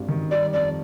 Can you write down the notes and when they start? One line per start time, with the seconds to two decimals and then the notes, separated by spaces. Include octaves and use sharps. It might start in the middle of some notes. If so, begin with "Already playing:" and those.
Already playing: G#1 G2
0.08 D#3
0.31 G3 D5
0.53 F2 D5